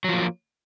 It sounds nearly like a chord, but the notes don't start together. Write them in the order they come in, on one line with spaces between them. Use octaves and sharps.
F#3 F3 A#3